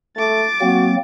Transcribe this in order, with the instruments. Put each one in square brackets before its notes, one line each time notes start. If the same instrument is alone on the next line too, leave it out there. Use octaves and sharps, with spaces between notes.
[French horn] A3 [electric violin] D6 A6
[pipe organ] F#3 A#3 C4 [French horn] F#4